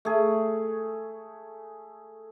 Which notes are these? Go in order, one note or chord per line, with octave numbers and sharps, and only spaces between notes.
A3 G#4